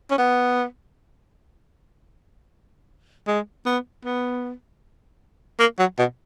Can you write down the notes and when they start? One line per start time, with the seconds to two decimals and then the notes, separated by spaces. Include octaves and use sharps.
0.11 C#4
0.18 B3
3.27 G#3
3.66 B3
4.05 B3
5.60 A#3
5.79 F#3
5.98 B2